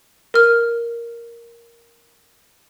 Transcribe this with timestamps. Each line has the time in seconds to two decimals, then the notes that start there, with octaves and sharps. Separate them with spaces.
0.34 A#4 F6